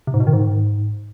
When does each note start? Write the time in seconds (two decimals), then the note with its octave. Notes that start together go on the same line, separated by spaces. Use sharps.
0.07 C3
0.14 G#2
0.20 B2
0.27 D#3
0.33 G#2